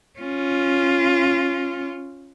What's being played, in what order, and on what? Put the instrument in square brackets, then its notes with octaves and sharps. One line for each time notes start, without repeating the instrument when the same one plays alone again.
[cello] C#4 F4